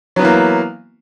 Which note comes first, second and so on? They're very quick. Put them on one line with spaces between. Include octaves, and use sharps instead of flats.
F#3 B3 E3 A#3